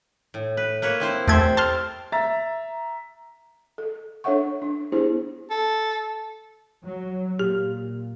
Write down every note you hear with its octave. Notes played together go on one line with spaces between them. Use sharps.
A2
B4
A#3 B4 C#5
C4 E4 C5
E2 A3 G4 A4 C5 G#6
A5 C6 F6
E5 A#5 A6
A4
D4 A4 C#5 E5 F#5 C#6
D4
B3 D4 E4 G4 G#4 C5
A4
F#3
A#2 G4